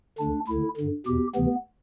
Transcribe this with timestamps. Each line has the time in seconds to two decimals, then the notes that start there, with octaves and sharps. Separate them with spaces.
0.19 D2 D3 D4
0.48 D2 D3 E4
0.77 G2 D3
1.06 E2 B2 G4
1.35 D2 C3 E3 B3